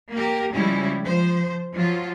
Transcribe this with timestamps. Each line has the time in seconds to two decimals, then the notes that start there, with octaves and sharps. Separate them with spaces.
0.11 A#3 G4 A#4
0.52 C#3 F3 G3 G#3 C#4 E4
1.04 F3 C5
1.74 F3 F#3 F4